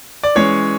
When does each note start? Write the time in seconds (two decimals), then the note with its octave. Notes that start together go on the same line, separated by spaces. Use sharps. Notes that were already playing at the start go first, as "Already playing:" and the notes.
0.23 D5
0.35 E3 G#3 C#4 C#5